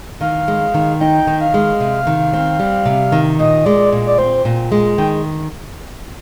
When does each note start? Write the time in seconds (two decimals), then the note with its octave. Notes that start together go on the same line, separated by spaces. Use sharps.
0.20 D#3 F5
0.48 G#3
0.74 D#3
1.00 D#4 G5
1.27 D#3
1.41 F5
1.54 G#3
1.80 C3
2.07 D#3
2.33 C4
2.59 G3
2.86 C3
3.12 D#3
3.39 A#2 D#5
3.65 G#3 D5
3.92 A#2
4.07 D5
4.18 C4 C5
4.45 A#2
4.72 G#3
4.98 D#3 G5